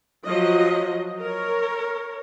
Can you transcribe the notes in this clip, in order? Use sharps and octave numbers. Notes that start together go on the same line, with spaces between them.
F3 F#3 D#5
A#4 C#5